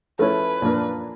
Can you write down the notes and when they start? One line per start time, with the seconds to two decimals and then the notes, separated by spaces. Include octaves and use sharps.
0.19 F3 A3 C#4 E4 B4
0.62 A#2 F3 A#3 D4